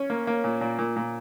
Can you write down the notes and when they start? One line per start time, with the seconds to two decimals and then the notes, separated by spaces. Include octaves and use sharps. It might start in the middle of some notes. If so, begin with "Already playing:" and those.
Already playing: C#4
0.10 A#3
0.27 A#3
0.44 A#2
0.61 A#2
0.79 A#2
0.96 A#2